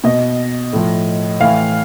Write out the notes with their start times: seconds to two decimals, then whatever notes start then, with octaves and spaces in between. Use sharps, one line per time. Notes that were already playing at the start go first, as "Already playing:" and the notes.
0.04 B2 D#5
0.73 A2 F3
1.40 A2 E3 F5